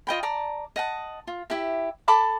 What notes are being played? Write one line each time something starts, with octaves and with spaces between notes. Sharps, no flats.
F4 D#5 G5 B5
D5 A5 A#5
D#5 F#5 A5
F4
E4 G4 E5
A4 A5 B5 D6